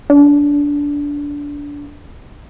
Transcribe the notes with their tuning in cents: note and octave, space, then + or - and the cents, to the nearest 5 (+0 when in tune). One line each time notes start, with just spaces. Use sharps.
D4 -20